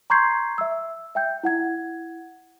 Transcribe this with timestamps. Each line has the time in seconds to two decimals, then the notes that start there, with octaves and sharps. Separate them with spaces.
0.10 A#5 C6 C#6 G6 G#6 C7
0.58 E5 E6
1.15 E5 G5 G6
1.43 E4 F#5 G#6